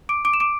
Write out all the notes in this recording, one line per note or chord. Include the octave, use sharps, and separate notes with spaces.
D6 D7
D6 D7
E7
D6 D7